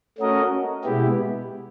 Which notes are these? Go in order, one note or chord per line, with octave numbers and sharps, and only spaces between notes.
A3 C#4 F#4 A#4 D#5
B2 G#3 B3 E4 G4